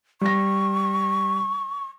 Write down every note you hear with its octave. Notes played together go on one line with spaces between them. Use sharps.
G3 C#6 A#6